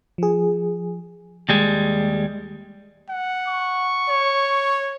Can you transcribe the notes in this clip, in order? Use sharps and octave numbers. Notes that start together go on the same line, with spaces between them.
F3 G#4
D#2 G3 G#3
F#5
C#6
C#5